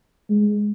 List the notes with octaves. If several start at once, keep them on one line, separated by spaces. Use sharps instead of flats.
G#3